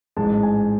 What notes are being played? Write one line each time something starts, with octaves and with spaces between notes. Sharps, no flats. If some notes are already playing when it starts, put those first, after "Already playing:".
A1 G#2 G#3 A5
G#5